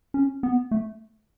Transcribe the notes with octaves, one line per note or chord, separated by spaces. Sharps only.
C#4
B3
A3